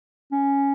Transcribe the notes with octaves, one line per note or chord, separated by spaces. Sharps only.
C#4